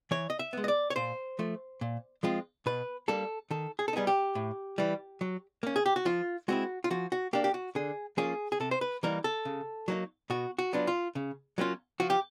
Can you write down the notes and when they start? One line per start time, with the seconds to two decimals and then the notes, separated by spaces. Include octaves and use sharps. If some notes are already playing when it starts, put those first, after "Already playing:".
0.11 E3 C#5
0.30 D#5
0.39 E5
0.53 G#3 B3
0.64 D#5
0.68 D5
0.90 C#5
0.96 A#2 C5
1.39 F3 A3
1.81 A#2
2.23 F3 G#3 C4 F4
2.66 B2 B4
3.08 G3 A#3 D4 A4
3.51 D#3 A4
3.79 G#4
3.88 A4
3.93 G3 B3 D#4 G#4
4.07 G4
4.35 A2
4.78 E3 G3
5.21 F#3
5.63 A#3 C#4
5.76 G#4
5.86 G4
5.96 F#4
6.05 F3 F4
6.48 G#3 C4 E4 F#4
6.84 F4
6.90 F3 F#4
7.12 F#4
7.33 A#3 D4 G4
7.44 G4
7.54 F#4
7.75 D3 G#4
8.17 F3 A#3 C#4 F4 G#4
8.52 G#4
8.60 C3 A4
8.71 C5
8.81 B4
9.03 E3 G3 A#3 D#4 A#4
9.24 A4
9.45 C#3
9.88 F#3 A#3 D#4
10.30 B2 F#4
10.59 F#4
10.73 F#3 B3 D4 F4
10.87 F4
11.15 C#3
11.58 F#3 A#3 C#4 F4
12.00 F3 F#4
12.10 G4